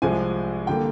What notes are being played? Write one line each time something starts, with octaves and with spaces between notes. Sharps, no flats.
C2 C3 F3 G#3 G#5
D3 G3 A#3 G5